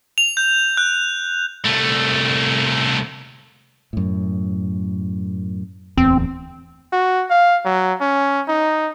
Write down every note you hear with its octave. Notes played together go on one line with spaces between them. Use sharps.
F7
G6
F#6
C2 A3
F#2 A2
D1 E2 C4
F#4
F5
F#3
C#4
D#4